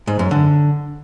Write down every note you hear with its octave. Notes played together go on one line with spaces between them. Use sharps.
G#2
F#2
D3